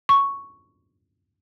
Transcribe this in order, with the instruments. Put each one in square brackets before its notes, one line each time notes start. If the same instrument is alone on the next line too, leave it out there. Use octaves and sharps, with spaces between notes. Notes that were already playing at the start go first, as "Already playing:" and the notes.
[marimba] C#6